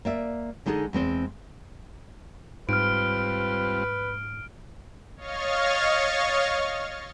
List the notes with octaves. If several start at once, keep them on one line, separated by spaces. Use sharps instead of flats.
A#3 D5 E5
D3 G#3 D#4 G#4 A4
E2 G#3 C4 C5
G#2 G3 C4 F4 B4 F6 D7
C#5 D#5 F5 C#6 F6 A6